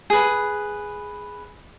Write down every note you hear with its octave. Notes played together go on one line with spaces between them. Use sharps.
G#4 B4